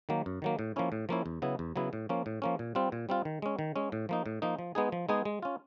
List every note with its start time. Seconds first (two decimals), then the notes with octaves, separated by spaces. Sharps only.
0.09 D#3 F#3 A#3
0.26 F#2
0.42 D#3 F#3 A#3
0.59 A2
0.76 F3 A#3 C#4 E4
0.92 A2
1.09 F3 A#3 C#4 E4
1.26 E2
1.42 C#3 F#3 B3 E4
1.59 E2
1.76 C#3 F#3 B3 E4
1.93 A2
2.09 F3 A#3 C#4
2.26 A2
2.42 F3 A#3 C#4
2.59 A#2
2.75 G3 C4 F4
2.92 A#2
3.09 G3 C4 F4
3.25 D#3
3.42 G#3 C#4
3.59 D#3
3.76 G#3 C#4
3.92 A2
4.09 F3 A#3 D#4
4.26 A2
4.42 F3 A#3 D#4
4.59 F3
4.75 G#3 B3 D#4 G#4
4.92 F3
5.09 G#3 B3 D#4 G#4
5.25 G#3
5.42 C#4 F4